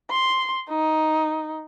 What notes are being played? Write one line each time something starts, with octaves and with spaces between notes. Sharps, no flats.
C6
D#4